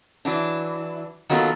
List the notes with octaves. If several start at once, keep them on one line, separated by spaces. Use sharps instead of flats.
E3 F#3 D4
D#3 F#3 A#3 B3 F4 A4